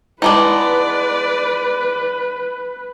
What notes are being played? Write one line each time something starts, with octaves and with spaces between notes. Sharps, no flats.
G#3 B3 D#4 E4 B4 D5 A5 D6